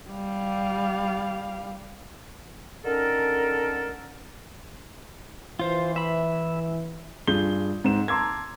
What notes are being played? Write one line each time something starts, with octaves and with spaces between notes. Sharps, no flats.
G3 F5
D3 D#3 C#4 A4 A#4
E3 F4 C5
E5 B5
G2 F4 G#4 G6 G7
G#2 C4 E7
A5 A#5 C6 D6 E6 G#6